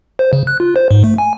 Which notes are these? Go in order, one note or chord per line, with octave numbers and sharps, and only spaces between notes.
C5
C#3
F#6
F4
C5
G#2
A3
G#5